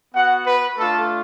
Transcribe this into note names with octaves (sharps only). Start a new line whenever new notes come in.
B3 F#4 F#5
B4
A3 D4 F4 A4